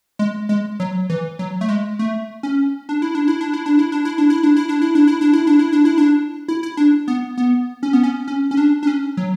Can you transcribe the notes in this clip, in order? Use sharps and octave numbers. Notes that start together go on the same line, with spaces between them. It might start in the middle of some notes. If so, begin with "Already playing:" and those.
G#3
G#3
F#3
E3
F#3
A3
G#3
A3
C#4
D4
E4
D4
E4
D4
E4
D4
E4
D4
E4
D4
E4
D4
E4
D4
E4
D4
E4
D4
E4
D4
E4
D4
E4
D4
E4
E4
D4
B3
B3
C#4
B3
C#4
C#4
C#4
D4
D4
C#4
F#3